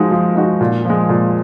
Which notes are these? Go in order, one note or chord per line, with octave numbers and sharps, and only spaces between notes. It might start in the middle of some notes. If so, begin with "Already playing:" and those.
Already playing: F3 G#3 D#4 F#4
F3
G#3 D#4 F#4
A#2
F3 G#3
A#2